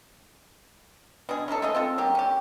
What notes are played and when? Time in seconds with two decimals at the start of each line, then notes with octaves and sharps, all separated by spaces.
1.29 B2 D4 G#4
1.48 C#4 D#4 G#4 A4
1.62 A3 G#4 D#5
1.75 C4 F4 A4
1.98 F#3 A#3 G4
2.15 C#4 G4